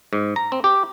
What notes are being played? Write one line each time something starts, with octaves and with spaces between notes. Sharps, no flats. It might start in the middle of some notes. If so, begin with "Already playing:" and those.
G#2
A#5
C4
G4